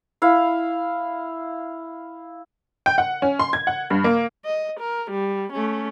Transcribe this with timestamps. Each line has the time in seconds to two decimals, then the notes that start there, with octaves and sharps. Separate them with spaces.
0.22 E4 F5
2.86 G5
2.98 F#5
3.22 C#4
3.39 C6
3.53 G#6
3.67 F#5
3.90 G2
4.04 A#3
4.45 D#5
4.80 A#4
5.11 G3
5.53 A3 C#4